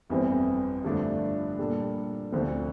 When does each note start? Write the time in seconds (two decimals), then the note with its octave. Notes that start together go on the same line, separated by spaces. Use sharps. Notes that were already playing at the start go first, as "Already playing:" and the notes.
0.09 G1 F2 E3 G3 C4
0.84 G2 D3 F3 A3 D4
1.58 A#2 G3 D4 A4
2.32 D2 D3 F3 C4